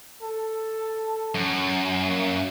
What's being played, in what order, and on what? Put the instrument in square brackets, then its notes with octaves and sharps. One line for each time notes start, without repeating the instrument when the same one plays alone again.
[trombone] A4
[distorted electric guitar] F#2
[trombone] A#3